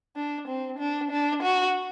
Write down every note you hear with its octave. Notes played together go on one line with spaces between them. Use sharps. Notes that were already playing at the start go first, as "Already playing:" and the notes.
D4
C4
D4
D4
F#4